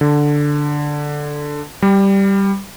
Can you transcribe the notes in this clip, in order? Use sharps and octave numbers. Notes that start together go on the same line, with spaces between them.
D3
G3